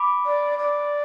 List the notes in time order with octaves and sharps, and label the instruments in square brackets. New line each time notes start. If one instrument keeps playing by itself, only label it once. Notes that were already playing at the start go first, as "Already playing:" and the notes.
Already playing: [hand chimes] B5 D6
[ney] D5
D5